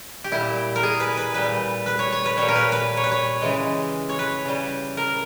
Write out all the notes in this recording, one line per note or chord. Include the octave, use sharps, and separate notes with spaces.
G4
A#2 G3 E4
A#4
G#4
B4
B4
A#2 G3 B4
B4
C#5
C#5
B4
G3 C#5
A#2
A#4
B4
B4
C#5
B4
C#5
C#3 E3 G#3
C#5
B4
C#3 G3
A#4